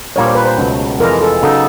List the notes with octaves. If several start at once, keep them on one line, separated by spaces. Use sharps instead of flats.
A#2 G3 A#3 D4 C#5
C5
B4
C5
C#2 B2 F#3 A3
F2 C3 E3 G#3 A#4
A4
C#3 F#3 B3 D#4 A4